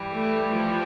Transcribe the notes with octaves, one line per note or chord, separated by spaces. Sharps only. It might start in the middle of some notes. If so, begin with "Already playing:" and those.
Already playing: G2 E3 G3
A3
F3